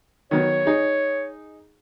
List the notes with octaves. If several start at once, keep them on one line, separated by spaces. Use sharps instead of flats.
D#3 F#3 B3 C#5
D#4 G#4